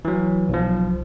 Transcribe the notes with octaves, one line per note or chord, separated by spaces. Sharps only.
E3 F#3
B1 F3